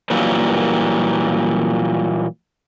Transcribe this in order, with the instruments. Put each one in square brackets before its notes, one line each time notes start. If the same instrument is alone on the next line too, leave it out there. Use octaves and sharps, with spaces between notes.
[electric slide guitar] A#2 E3 F#3 G3 A#3